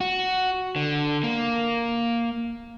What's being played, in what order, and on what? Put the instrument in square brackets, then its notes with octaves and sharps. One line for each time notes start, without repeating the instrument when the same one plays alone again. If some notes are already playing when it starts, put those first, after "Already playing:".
[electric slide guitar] F#4
D3
A#3